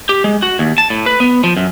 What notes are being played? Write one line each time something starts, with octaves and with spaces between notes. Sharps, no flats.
G4
G#3
F#4
D#2
A5
A2
B4
B3
F3
F#2